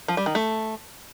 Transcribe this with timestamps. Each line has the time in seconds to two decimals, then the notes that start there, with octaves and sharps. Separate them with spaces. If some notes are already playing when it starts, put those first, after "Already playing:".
0.08 F3
0.17 G3
0.26 D#3
0.35 A3